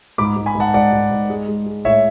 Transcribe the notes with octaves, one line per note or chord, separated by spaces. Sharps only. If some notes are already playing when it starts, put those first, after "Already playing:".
G#2 B5 D6
G#2
G#5 B5
G#2 F#5 A5
G#2 D5 F#5
G#2
G#2
G#3
G#3
G#3
A2 C#5 E5